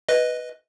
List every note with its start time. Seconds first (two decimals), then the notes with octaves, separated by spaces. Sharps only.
0.09 B4 D#5